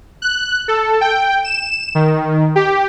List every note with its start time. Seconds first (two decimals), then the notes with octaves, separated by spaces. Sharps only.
0.22 F#6
0.68 A4
1.01 G5
1.44 E7
1.95 D#3
2.56 G4